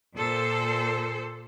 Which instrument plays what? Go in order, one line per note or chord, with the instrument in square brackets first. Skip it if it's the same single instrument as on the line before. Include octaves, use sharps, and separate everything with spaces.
[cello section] A#2 A4 C5